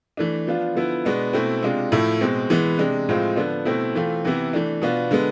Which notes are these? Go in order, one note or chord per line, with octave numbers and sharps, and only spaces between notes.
E3 A3 D4
F3 B3 D4 F4
D3 F3 B3 E4
B2 G#3 B3 D4
B2 A3 C4 E4
C3 G#3 D4 F4
A2 F3 A3 E4
B2 G#3 C4
E3 G#3 B3
C3 G#3 D4
A2 F3 G#3 C4 F4
D3 F3 B3 D4
B2 A3 C4 E4
E3 A3 C4 F4
C3 E3 B3 E4
E3 A3 D4
B2 B3 D4 F4
D3 G#3 B3